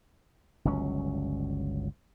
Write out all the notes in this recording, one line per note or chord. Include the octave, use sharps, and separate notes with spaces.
G1 C#2 F#3 C#4